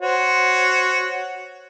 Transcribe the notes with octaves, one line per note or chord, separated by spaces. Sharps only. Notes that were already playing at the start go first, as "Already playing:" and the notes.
F#4 C5 C#5